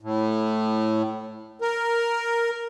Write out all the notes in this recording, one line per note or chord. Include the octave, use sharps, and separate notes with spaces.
A2
A#4